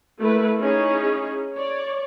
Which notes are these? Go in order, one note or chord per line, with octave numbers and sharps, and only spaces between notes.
A3 A#3 E4 B4
C#4 D#4 E4 G#4 C#5
C#5 D5